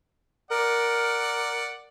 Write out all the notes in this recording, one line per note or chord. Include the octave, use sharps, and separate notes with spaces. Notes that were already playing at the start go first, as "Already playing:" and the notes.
A#4 D5 F#5